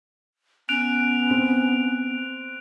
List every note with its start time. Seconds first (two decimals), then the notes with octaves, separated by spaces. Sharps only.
0.69 B3 C#4 F#6 D7 F7
1.31 C4